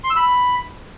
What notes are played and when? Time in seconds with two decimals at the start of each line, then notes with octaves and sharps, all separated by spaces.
0.04 C6
0.10 E6
0.16 B5